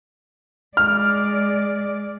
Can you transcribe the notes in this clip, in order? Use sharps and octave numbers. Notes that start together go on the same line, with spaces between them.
G#3 D5 F6